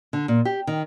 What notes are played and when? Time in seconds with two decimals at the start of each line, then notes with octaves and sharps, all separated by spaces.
0.13 D3
0.28 A#2
0.45 G4
0.67 D#3